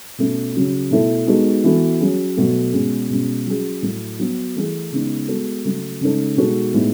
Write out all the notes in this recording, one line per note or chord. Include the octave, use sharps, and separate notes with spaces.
B2 A3 C#4
C#3 F#3 C#4
B2 A3 E4 A4
G#3 B3 D#4 F#4 A4
E3 B3 F#4 A4
F#3 C#4 G#4
B2 F#3 A3
B2 G#3 C#4 G#4
B2 G#3 C#4
F#3 C#4 G#4
A2 F#3 A3
F#3 B3 F#4
E3 A3 E4 G#4
C#3 G#3 B3 D#4
G#3 B3 F#4 A4
C#3 F#3 A3
C#3 G#3 D#4 A4
B2 G#3 D#4 F#4 A4
A2 G#3 B3 D#4